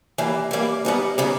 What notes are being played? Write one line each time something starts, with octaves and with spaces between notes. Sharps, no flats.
E3 G3 A#3
E3 G3 A#3
C#3 G3 B3 D#4
C#3 G3 B3 D#4